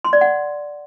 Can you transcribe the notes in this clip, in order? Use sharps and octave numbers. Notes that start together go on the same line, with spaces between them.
C6
D5
F#5